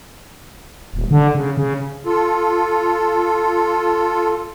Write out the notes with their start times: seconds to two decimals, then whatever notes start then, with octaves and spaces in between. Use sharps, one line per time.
0.94 D#1
1.11 D3
1.35 C#3
1.57 C#3
2.06 F4 A4